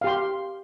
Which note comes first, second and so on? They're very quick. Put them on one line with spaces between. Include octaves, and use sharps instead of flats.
F5 G4 C6